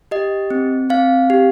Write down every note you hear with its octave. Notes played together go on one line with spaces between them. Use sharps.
G4 D#5
C4
C4 F5
G4